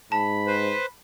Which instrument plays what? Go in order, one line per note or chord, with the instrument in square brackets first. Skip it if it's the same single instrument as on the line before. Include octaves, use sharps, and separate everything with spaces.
[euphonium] G#2 [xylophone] A5 [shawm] B5
[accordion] B4 C5